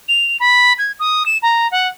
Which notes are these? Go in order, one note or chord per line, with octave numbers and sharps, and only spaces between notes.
F7
B5
G#6
D#6
E7
A#5
F#5